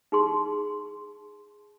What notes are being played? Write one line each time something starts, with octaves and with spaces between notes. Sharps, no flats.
D#4 G#4 C6